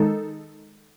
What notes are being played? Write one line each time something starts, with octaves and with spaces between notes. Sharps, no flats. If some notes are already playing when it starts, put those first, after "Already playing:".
Already playing: D#3 G#3 D#4 A4